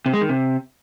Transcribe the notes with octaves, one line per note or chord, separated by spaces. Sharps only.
C3
G#3
D#3
C3